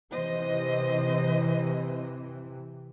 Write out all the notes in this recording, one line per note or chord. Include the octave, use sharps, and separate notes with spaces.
C3 E3 C5 D#5